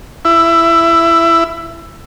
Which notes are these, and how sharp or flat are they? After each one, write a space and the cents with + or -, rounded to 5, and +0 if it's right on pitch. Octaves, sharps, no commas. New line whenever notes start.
E4 +15